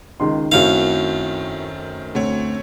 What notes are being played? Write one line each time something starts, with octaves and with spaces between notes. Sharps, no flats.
C#2 D#3 C6
F#2 D#3 A3 C4 E4 F#4 F5
D2 A3 C4 C#5